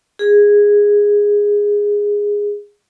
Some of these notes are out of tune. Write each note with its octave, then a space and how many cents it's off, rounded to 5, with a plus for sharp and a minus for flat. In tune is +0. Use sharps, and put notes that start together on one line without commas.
G#4 -10